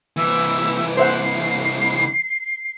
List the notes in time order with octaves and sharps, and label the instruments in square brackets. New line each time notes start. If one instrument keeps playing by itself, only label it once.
[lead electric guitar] C2 E3 [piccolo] E5
[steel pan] C5 E5 F#5 [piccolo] C7